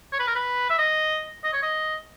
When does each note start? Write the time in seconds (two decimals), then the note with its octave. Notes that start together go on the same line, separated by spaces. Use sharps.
0.12 C#5
0.19 B4
0.27 A#4
0.35 B4
0.70 E5
0.78 D#5
1.44 D#5
1.53 C#5
1.63 D#5